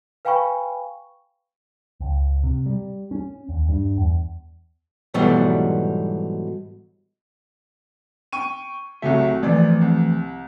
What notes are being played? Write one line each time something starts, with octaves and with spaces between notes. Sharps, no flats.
B4 F5 G5 G#5 B5 C#6
C#2
C3
G3
C#4
D#2
G2
E2
G#2 B2 E3 F#3 G3 A3
G5 C#6 D#7
C2 C#3 F#3 A3 E5
G#1 E3 F3 A3 D5
C2